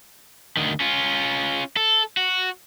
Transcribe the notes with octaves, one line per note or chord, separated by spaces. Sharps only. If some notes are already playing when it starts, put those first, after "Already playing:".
D2 D#3
C#4 F4
A4
F#4